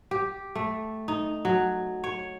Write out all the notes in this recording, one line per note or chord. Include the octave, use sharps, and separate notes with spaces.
G4
A3
D#4
F#3
C#5